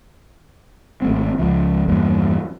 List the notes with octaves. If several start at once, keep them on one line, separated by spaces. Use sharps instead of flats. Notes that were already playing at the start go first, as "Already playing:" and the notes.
G#1 A3 C4
C#2 F3
E2 G2 A#3